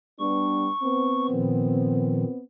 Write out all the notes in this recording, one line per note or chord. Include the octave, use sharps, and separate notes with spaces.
G3 B3 D4 C#6
B3 C4
A#2 D#3 F3